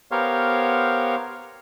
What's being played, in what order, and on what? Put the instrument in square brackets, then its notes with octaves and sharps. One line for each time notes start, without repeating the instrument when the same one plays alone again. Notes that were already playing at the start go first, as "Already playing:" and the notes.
[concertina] B3 G4 A#4 C5 C#5 F5